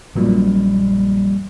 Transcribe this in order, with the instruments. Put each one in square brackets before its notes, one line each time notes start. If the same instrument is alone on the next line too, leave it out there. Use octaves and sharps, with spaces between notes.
[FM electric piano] A#1 F#2 A#2 [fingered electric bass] F3 G3 A#3